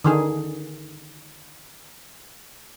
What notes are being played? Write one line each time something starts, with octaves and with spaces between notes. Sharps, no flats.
D3 D#3 G#4